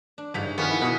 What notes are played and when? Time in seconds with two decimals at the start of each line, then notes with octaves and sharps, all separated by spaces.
0.18 D4
0.34 G1 C#3 G3 D#4 B6
0.58 D#3 F3 B3 G#5 C#6 F6
0.71 E4
0.82 B2 G#4 E5 F#5 D#6